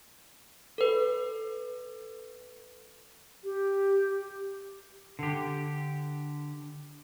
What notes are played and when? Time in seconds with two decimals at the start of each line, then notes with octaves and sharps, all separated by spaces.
0.78 A4 B4
3.44 G4
5.19 D3 G4